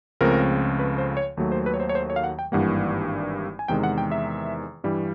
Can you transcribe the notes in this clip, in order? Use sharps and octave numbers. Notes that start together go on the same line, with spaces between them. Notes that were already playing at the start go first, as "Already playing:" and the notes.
C#2 C#3 F3 A3 C4 A#4
B4
C5
C#5
D#2 D#3 F#3 A3
C5
B4
C#5
C5
C#5
C5
C#5
F5
F#5
G5
G#1 G2 E3 G3 A#3 F#5
G#5
E2 C3 D#3 G#3 G5
F#5
G5
E5
G2 E3 G3